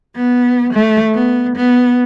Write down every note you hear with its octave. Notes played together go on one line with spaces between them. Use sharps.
B3
A3
B3
B3